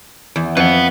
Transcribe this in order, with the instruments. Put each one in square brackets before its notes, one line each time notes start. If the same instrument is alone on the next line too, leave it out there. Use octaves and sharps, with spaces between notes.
[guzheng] E2
[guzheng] F2 [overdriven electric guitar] B4 F#5